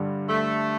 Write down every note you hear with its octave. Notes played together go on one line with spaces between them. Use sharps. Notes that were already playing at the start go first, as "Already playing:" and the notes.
Already playing: G2 D3 G3
A3